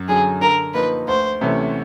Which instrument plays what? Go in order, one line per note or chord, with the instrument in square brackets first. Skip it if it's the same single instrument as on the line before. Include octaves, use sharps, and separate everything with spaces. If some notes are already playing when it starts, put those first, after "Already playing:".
Already playing: [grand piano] F#2
[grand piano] D3 F#3 [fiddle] G#4
[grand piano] D3 [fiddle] A#4
[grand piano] F3 A#3 D#4 [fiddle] B4
[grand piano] D2 [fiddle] C5
[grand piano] C3 E3 A3 C#4